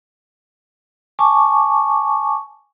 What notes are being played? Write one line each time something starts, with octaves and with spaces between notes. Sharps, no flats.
G#5 A5 C#6 D6